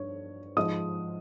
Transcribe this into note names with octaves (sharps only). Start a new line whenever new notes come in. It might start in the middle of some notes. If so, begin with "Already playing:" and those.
Already playing: G2 C#5
G#2 F3 G#3 D#5 D#6